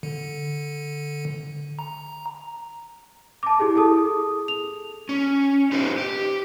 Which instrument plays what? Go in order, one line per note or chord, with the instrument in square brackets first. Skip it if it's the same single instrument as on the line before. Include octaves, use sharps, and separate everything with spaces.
[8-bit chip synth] D3
A#5
[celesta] A5 D6
E4 G4 G#4
G#4 A4 A5 D#6
F7
[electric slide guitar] C#4
D#4 G4 B4 C5
G4